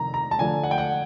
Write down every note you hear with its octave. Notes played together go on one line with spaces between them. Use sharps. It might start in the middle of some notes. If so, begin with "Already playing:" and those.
Already playing: F2 C3 D#3 A#5
A#5
A5
D3 F3 A3 D4 G#5
F#5
G5
F#5